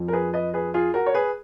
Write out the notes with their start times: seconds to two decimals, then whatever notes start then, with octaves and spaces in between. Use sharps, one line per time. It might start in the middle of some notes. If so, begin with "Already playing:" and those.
Already playing: F2 F3
0.08 A#4
0.13 G#4 B4
0.33 B4 D#5
0.54 G#4 B4
0.74 F4 G#4
0.94 F#4 A#4
1.06 C#5
1.14 G#4 B4